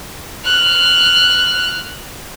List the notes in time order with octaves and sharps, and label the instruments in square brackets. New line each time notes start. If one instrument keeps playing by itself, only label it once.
[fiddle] F6 F#6